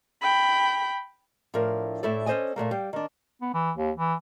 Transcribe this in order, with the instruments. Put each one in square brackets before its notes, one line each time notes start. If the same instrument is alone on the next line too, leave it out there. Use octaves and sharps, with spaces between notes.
[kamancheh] G5 B5
[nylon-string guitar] A2 F3 D4 A#4
A2 A3 E4 A4 D5
C#4 A4 C5 D5 D#5 G#5
A#2 F#3 A3 A#3
G3 F5 G5
D#3 D4
[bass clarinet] B3
E3
D#2
E3